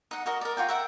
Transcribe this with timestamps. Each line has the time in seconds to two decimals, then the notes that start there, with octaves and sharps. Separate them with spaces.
0.11 D#4 F#5
0.26 F#4 A#4 D#5
0.41 A#4 D5
0.57 F4 F#4 G5
0.69 A#4 E5 F#5 G5